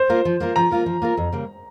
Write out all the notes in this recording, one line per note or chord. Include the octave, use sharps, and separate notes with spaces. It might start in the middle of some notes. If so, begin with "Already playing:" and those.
Already playing: C5
A#3 F4 A#4
F3
A#3 F4 A#4
F3 A#5
A#3 F4 A#4
F3
A#3 F4 A#4
F2
C#3 G3 A#3